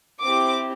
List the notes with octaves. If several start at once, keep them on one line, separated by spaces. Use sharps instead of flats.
C4 E4 G4 D6